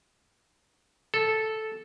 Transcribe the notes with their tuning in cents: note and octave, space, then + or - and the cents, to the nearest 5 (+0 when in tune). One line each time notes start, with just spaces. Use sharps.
A4 -5